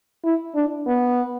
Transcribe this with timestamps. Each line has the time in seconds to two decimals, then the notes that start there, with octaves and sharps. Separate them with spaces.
0.25 E4
0.55 D4
0.87 B3